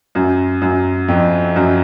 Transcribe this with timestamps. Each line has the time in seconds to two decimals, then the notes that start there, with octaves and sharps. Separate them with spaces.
0.15 F#2
0.62 F#2
1.08 F2
1.56 F#2